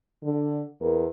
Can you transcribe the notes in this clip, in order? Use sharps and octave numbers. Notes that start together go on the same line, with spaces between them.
D3
E2 A#4